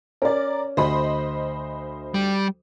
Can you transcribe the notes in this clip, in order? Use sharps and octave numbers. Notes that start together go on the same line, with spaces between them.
C#4 A#4 D5
D2 C5 D#5 B5
G3